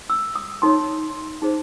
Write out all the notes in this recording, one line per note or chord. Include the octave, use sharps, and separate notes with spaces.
E6
D#6
D#4 A4 C#5 C6
D#4 G#4 C5